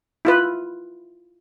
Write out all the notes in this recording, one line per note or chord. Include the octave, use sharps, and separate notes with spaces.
E4 F4 B4